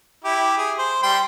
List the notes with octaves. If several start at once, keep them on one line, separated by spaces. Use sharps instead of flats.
E4 G4
G#4
C5
G3 G5 C6